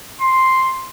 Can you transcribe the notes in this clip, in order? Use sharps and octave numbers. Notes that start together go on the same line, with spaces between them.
C6